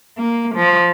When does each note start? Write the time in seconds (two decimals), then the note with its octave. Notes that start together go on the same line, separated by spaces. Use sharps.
0.18 A#3
0.55 F3